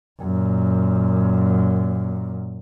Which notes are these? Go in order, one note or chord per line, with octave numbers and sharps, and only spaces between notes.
F#2 A#2